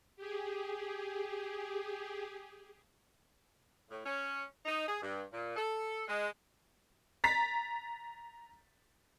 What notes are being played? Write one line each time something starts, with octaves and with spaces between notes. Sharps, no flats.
G4 G#4
A2
C#4
D#4
G#4
G2
A#2
A4
G#3
A#5 A6 B6